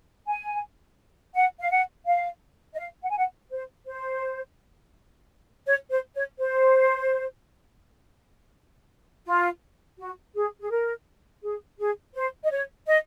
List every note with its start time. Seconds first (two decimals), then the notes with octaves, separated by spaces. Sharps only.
0.27 G#5
1.35 F#5
1.59 F5
1.71 F#5
2.07 F5
2.74 D#5
2.79 F5
3.03 F#5
3.10 G#5
3.18 F#5
3.51 C5
3.86 C5
5.67 C#5
5.91 C5
6.15 C#5
6.39 C5
9.26 F4
9.99 F#4
10.35 G#4
10.61 G#4
10.70 A#4
11.43 G#4
11.79 G#4
12.15 C5
12.44 D#5
12.50 C#5
12.87 D#5